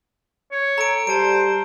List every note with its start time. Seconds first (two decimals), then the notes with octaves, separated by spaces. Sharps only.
0.51 C#5
0.78 A4 A#5 D7
1.07 G3 C5 A5 D7